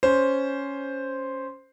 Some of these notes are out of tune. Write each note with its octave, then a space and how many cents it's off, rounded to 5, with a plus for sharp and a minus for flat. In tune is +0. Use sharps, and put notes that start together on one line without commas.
C#4 +5 C5 +0